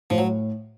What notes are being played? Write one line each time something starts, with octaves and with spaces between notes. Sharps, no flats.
A2 F3
F#3